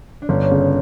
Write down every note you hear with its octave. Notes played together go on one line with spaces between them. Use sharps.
D4
G1 C#4
C#3